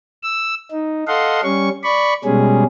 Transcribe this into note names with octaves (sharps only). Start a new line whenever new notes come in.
E6
D#4
A4 D#5 F5 F#5 C6
G3 C#4 C#6
D5 B5 C#6
B2 G3 G#3 C#4 G#4